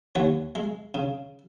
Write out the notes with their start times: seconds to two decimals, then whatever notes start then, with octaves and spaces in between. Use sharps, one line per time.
0.15 D#2 C#5 F#5
0.55 G#3
0.94 C#3